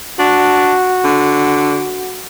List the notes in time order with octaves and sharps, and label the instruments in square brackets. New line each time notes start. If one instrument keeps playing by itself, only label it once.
[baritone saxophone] D4 [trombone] F#4
[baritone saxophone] D3